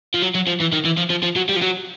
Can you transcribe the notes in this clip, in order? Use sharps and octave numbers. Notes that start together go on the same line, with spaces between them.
F3
F#3
F#3
F3
E3
D#3
E3
F3
F3
F3
F#3
G3
F3
F#3